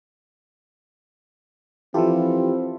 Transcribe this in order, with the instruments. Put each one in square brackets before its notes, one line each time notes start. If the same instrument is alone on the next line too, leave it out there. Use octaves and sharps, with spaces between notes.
[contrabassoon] E3 [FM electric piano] F3 G4 [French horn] C4 [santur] E4 F4 A4